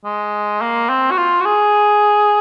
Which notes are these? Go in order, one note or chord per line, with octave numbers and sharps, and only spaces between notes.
G#3
A#3
C4
F#4
F4
F#4
G#4